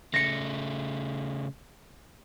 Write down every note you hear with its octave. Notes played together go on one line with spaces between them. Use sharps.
C#3 A3 A#6 C#7